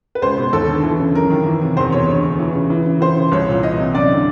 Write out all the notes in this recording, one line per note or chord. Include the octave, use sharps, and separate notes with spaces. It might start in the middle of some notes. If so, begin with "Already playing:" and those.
B4
C#2 C5
B2
D#2 A4
D3
E3
C#3
F#2 A#4
D#3
E3
C3
E2 C5
B2 C#5
D2
D3
E3
C#3
E3
C#3
E3 C5
C#3
C2 C#5
A#2
E3 D#5
C3
F#2 D5
D3